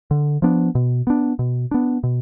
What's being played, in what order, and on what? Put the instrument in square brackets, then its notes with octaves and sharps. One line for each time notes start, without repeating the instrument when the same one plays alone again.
[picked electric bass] D3
F3 B3 D4
B2
B3 D4
B2
B3 D4
B2